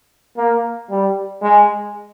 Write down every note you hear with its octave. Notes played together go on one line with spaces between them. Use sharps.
A#3
G3
G#3